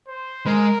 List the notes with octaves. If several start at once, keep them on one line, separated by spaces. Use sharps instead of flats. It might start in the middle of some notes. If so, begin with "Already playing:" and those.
C5
G#3 A#4